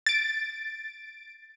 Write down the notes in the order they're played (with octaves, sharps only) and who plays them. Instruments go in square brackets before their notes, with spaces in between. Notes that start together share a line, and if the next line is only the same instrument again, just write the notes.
[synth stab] A6 D7